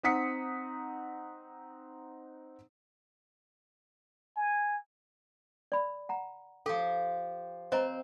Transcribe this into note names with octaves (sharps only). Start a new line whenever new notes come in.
C4 D#4 F#5 D#6 B6 C#7
G#5
D5 B5
F#5 A#5
F3 G4 A4
C4 C5 D#5 A#5